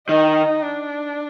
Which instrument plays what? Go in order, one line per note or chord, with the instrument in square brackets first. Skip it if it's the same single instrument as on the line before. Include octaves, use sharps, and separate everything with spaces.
[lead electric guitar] D#3 [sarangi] D#4
[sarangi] D4